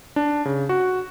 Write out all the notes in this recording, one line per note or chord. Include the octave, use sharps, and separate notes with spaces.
D4
C#3
F#4